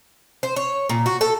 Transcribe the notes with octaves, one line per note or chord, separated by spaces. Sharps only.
C5
C#5
A#2
F#4
A4